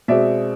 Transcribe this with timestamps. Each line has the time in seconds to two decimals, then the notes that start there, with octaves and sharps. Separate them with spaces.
0.08 B2 G#3 C4 D5 E5